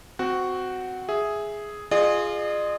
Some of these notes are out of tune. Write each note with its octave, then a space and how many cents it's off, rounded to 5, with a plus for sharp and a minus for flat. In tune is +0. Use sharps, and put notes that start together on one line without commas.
C4 -20 F#4 +0 F#5 +0
G#4 +0 E5 +0
F4 +0 G#4 +0 D#5 -45